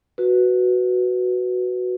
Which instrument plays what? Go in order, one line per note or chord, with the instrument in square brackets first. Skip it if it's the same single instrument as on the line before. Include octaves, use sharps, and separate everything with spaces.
[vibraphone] F#4 B4